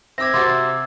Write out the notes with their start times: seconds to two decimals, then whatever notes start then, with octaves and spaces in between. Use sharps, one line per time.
0.18 C4 E5 D6 E6 G#6 A#6
0.34 C3 F#4 C5 C6 D6 A6